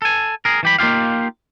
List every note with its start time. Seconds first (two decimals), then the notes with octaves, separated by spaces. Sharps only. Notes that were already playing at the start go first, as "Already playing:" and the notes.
0.02 A4 G#5
0.45 G#4 A#4
0.63 E3 G4 B5
0.79 A#3 D#4 F4 G4 F5